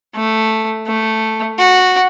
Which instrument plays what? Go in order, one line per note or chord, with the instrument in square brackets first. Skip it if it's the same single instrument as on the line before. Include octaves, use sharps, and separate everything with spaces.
[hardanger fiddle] A3
A3
F#4